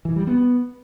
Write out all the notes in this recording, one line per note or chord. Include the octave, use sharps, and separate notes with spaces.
E3
G3
B3